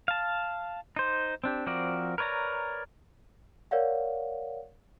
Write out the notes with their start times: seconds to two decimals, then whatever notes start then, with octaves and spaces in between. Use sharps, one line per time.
0.08 F5 A5
0.96 D#4 C5
1.44 C4 D4 G4
1.67 F3 C4 F#4 A#4 D5
2.18 A#4 B4 C#5 D5 A#5
3.71 A#4 C#5 D5 F5 F#5